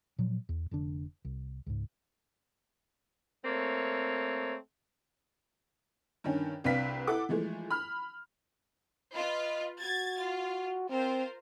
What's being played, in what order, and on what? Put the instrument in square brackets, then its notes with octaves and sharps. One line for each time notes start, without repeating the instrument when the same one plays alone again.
[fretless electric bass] A#2 F3 F#3
E2
F1 D3 D4
C2
C#2 G#2
[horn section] A3 A#3 C4 C#5
[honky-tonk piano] G2 D#3 C#4
C2 C4 D4 B4 F5 B6
E4 A4 F#5 D6
E3 F3 G#3 A3
B5 F6
[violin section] F4 B4 [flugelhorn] D#5
[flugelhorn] F#4 [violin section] G#6 A6
[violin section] F4
[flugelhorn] C4 [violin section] F4 A#4 C5